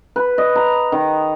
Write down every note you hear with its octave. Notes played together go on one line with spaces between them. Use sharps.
B4
D#5
A#5
D#3